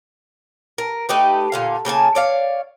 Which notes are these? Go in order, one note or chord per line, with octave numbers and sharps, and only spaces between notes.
A#4
A3 D#4 G4 B4
A#2 D3 F5
C#3 A#3 G#5 A5
C#5 D5 F5